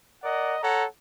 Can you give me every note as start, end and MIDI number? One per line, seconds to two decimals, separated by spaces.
0.23 0.56 70
0.23 0.56 74
0.23 0.56 75
0.23 0.56 78
0.62 0.85 69
0.62 0.85 73
0.62 0.85 78
0.62 0.85 82